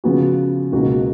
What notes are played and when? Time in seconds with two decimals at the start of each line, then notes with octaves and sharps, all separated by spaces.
0.04 C#3 F3 B3 F#4
0.72 C#2 B2 A#3 D#4 F#4